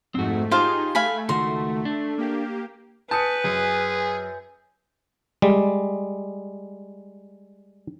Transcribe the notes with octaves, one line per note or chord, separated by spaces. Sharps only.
F2 G#2 A3 C4 F#4
D#4 F4 G4 G#4 C5 F5 A5
A3 F5 G#5 B5
C#2 D#3 F#4 C6
D4
A#3 G4
B4 G#5 A5 D#6 G6 C#7
F#2 G#4
G3 G#3